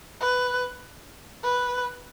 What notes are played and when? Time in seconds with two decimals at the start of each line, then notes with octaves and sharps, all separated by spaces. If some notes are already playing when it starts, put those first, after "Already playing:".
0.20 B4
1.44 B4